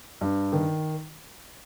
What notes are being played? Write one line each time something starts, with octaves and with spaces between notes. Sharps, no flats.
G2
D#3